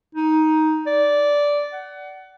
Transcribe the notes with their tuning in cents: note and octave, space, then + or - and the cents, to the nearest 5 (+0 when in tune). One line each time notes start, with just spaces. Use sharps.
D#4 +10
D5 -10
F#5 +25